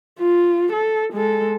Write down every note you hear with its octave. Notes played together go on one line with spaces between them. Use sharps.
F4
A4
G#3 A4